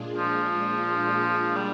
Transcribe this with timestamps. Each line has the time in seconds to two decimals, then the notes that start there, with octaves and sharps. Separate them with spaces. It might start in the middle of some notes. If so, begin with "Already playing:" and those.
Already playing: A#2 G#3 D4 F4 G#4
0.18 F3
1.56 G3